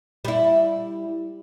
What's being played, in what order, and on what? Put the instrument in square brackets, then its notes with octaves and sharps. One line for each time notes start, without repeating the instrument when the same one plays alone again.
[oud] G3 E4